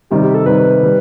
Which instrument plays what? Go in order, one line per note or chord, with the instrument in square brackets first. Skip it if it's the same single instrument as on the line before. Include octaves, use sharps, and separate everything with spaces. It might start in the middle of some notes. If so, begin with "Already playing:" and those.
[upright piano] C3 D#3 G3 [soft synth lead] G4
[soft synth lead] G4
A4
[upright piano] C3 D#3 G3 [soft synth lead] B4
[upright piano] D#3 G3